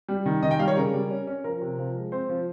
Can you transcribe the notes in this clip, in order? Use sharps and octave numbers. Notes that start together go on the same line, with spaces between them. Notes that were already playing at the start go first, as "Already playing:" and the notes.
G3
D#3
D#3 D#5
G5
G3 F5
C#5
C#3 A#4
G3
C#4
C#4
F3 A#4
C3
F3
G#3
C4 C5
F3